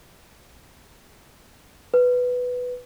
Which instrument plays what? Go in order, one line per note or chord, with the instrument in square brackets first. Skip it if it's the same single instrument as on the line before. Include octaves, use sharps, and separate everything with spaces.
[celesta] B4